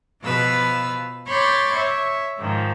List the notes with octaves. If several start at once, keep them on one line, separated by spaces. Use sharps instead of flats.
B2 F3 B4 F5 E6
C#5 B5 C6 D6 G6 A6
C#5 E5
G#2 D#3 F3